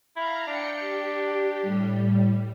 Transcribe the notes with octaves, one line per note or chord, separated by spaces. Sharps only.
E4 F5 A#5
D4 G5 C#7
G4
A2 G3